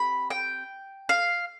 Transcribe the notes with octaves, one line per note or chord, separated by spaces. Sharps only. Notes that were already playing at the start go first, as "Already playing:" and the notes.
Already playing: C4 G4 B5
G5
F5